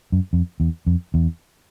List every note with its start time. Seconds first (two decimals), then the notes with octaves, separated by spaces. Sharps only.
0.12 F#2
0.33 F2
0.60 E2
0.86 F2
1.14 E2